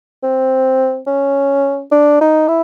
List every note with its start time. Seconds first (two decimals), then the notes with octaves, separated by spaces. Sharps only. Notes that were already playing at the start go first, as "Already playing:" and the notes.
0.23 C4
1.07 C#4
1.91 D4
2.21 D#4
2.48 E4